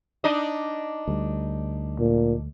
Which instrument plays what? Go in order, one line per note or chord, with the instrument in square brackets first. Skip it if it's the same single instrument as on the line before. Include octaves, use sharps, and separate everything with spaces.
[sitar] D4 D#4 D#5
[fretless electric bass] D2 G3
[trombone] A#2